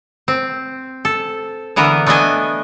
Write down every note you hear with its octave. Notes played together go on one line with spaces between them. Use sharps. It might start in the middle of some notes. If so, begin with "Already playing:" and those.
C4
A4
D3 E3 B3 A#4
A3 B3 D4 D#5 G#5